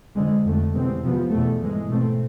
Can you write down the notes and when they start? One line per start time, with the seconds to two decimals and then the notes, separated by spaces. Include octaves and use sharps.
0.15 F2 D3 G#3
0.44 F2 D3 A3
0.73 E2 C3 G#3 C4
1.02 C3 F3 B3
1.31 E2 B2 A3
1.60 G#2 E3 G#3
1.89 B2 A3 C4